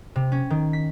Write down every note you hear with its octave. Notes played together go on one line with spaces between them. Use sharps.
C3
C#4
D#3
B6